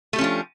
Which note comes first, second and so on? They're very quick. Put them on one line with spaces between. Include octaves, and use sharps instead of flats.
A3 G4 C#4 F3 D4